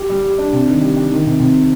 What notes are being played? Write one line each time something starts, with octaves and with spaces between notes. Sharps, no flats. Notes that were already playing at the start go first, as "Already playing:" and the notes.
Already playing: G4
G3
G4
D4
C3
D#3
G3
G3
D#3
C3
C3